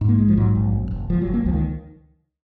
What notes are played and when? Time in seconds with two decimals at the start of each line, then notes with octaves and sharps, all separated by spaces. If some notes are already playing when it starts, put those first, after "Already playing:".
0.01 G#2
0.09 A#3
0.18 A#1 G#3
0.29 F3
0.37 G#2 F#3
0.55 A#1
0.73 F#2
0.91 F#1
1.10 F#1 F3
1.22 F#3
1.27 F#1
1.34 A#3
1.46 C#2 F3
1.53 D#3